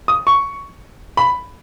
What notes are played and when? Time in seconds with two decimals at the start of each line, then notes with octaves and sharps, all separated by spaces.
0.08 D#6
0.27 C#6
1.17 B5